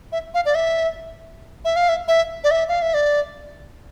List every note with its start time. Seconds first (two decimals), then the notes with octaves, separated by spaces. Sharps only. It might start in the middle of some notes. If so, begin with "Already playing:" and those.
0.12 E5
0.34 F5
0.46 D5
0.55 E5
1.65 E5
1.76 F5
1.89 E5
2.08 E5
2.44 D5
2.51 E5
2.69 F5
2.82 E5
2.94 D5